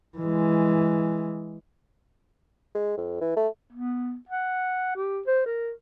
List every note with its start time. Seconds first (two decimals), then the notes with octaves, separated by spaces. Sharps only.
0.18 E3 G#3
2.75 G#3
2.98 F2
3.21 E3
3.36 A3
3.72 B3
4.29 F#5
4.96 G4
5.26 C5
5.46 A#4